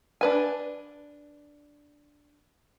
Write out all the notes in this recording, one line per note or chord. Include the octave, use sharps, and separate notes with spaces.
D4 B4 G#5